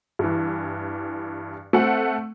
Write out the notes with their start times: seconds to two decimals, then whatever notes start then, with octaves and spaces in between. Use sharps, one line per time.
0.19 G2 E3
1.73 A3 C4 F#5